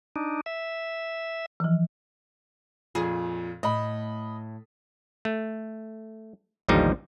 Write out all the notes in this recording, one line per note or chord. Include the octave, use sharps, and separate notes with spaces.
D4 D#4
E5
E3 F3
F2 A#2 G#4
A2 D#5 B5
A3
A1 D#2 D3 F3 G3 D#4